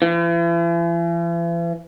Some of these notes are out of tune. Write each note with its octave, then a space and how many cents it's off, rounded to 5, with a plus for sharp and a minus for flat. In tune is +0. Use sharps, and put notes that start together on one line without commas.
E3 +45